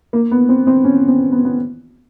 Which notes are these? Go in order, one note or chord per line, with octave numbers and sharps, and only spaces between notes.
A#3
B3
C4
C4
C#4
C4
B3
B3